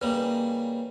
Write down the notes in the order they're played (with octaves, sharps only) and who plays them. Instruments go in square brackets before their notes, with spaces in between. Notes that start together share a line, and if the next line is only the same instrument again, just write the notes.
[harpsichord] C#3 E3 G3 A#3 D#4 [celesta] B4